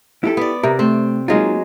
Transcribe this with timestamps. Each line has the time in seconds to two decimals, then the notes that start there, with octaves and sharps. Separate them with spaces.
0.24 E4 G4 A4
0.37 B3 D5
0.63 C3 A#4
0.79 A3 C4
1.28 F#3 G#3 A#3 D#4 F4